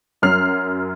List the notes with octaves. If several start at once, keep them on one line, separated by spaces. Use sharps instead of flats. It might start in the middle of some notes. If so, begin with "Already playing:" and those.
F#2 F#3 F6 C7